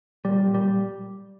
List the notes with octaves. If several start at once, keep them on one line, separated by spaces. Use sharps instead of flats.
A#2 G3
A#2
G3